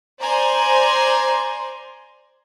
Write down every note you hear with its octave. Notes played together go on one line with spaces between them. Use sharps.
C5 D5 G#5 A#5 C6